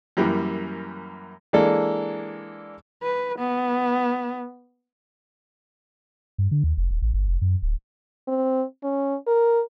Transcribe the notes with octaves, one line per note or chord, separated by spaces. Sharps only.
F#2 E3 G3 A#3
E3 G#3 A#3 D4 A4
B4
B3
G2
D3
D#2
F1
D#1
A1
G1
F1
F#2
D1
C4
C#4
A#4